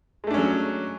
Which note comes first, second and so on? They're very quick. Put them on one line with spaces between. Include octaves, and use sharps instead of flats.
G#3 A3 D4 C#4 F#3